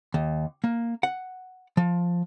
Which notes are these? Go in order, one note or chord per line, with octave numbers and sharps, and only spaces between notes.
D#2
A#3
F#5
F3